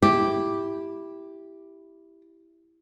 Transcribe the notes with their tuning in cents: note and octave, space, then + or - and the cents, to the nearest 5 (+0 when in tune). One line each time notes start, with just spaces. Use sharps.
E4 +0 G4 +0